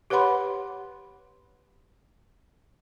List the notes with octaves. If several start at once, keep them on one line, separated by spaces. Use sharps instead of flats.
G4 B4 C#5 F#5 B5 C6